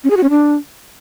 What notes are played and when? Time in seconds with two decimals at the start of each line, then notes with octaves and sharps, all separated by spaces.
0.04 C#4
0.10 G#4
0.17 F#4
0.23 C#4
0.30 D4